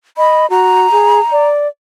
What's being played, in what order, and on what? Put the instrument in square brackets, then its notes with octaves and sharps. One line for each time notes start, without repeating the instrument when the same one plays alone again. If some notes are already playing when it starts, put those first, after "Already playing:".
[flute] D#5 [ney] B5
[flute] F#4 [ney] A#5
[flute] G#4
D5